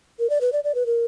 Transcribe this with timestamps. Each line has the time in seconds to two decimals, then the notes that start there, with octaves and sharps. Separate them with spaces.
0.19 A#4
0.30 D5
0.41 B4
0.53 D5
0.64 D5
0.75 B4
0.86 A#4